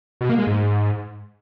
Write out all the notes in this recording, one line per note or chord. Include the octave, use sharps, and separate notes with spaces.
B2
A#3
G#3
G#2